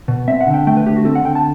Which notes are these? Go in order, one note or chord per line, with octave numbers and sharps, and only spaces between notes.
B2
C4 E5
F#5
D3
G5
A3 G5
B4
D3 G4
F#4
C4 A4
F#5
D3 G5
A5